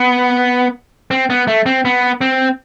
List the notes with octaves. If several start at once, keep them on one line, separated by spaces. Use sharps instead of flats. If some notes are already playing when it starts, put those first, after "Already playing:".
Already playing: B3
C4
B3
A3
C4
B3
C4